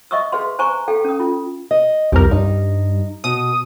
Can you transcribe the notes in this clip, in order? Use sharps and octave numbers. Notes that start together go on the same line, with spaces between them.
D#5 E5 C#6 D#6 E6
G#4 B4 F5 C6
C5 G#5 A#5 C#6
A4 F5 G5
C#4 D#6
F4
D#5
C2 F2 G4 A#4
G2 D#4
B2 D#6